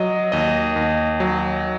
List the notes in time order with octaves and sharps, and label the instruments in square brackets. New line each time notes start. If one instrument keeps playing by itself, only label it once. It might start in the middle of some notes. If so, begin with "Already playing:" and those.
Already playing: [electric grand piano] F#3 D#5
D#2 D#5
D#2
F#3